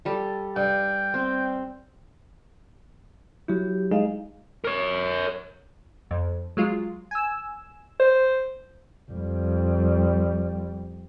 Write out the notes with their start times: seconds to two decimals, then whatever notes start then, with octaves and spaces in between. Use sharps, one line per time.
0.05 G3 A4
0.56 G2 G5
1.14 C4
3.48 F#3 E4 G4
3.91 G#3 D#4 G#4 D#5 F5
4.64 A#4 C#5
6.11 F2
6.57 F#3 G#3 F4
7.11 G#5 E6
8.00 C5
9.11 F2 G3